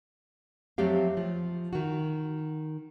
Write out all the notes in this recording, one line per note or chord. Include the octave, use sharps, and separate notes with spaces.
F2 F#3 A3 C4 G4 F5
F3
D#3 F#4